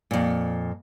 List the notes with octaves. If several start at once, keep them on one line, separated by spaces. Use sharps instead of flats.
F2 A#2